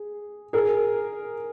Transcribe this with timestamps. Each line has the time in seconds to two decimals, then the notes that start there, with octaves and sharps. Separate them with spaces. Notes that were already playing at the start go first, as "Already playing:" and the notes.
Already playing: G#4
0.53 G#4 A#4